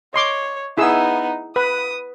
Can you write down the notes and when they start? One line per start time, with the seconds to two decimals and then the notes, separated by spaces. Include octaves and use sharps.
0.14 C#5 D#5 C6 D6
0.78 B3 D#4 E4 G#4 E6
1.56 B4 D#6